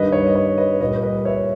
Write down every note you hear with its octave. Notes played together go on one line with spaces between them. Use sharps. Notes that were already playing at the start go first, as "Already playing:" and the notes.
Already playing: G2 D#3 G3 B4 D#5
C#5
D#5
C#5
B4 D#5
A#2 G3 B4 D#5
B4 D#5
C#5 E5